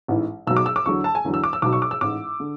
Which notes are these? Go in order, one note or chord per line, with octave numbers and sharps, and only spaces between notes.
A1 G#2 E3
B1 B2 F#3 E6
D6
E6
D6
E2 D3 F#3 C#6
A5
G#5
E2 D3 F#3
E6
D6
E6
B1 B2 F#3 D6
C#6
D6
E6
A1 G#2 E3 D6
D3